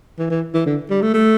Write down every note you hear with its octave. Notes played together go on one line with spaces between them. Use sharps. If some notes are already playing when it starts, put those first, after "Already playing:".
E3
E3
E3
D3
G3
A3
A3